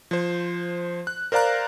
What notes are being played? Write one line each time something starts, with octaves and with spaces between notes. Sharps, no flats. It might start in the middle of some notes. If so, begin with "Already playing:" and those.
F3 C5
F#6
A#4 C5 D5 F5 A#5 F#6